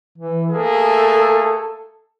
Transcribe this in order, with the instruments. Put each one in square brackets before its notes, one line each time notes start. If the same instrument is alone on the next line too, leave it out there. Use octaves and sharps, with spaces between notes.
[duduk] E3
[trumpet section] A3 A#3 G#4 [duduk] A4